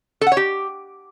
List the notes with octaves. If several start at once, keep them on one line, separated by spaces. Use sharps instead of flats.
A4
F#5
C#5
G4